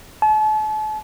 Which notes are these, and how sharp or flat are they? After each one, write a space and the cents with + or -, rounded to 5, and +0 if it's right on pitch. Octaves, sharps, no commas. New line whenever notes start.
A5 -40